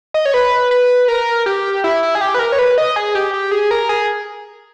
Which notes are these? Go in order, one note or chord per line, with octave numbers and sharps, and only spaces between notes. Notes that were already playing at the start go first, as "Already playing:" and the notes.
D#5
C#5
B4
B4
A#4
G4
E4
E4
G#4
G4
B4
A#4
C#5
B4
D#5
G#4
G4
G4
G#4
A#4
G#4